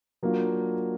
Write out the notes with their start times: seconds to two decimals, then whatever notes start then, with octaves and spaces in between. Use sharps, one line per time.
0.23 F#3 A#3 D4 F4